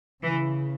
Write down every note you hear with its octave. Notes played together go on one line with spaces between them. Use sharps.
C#3 E3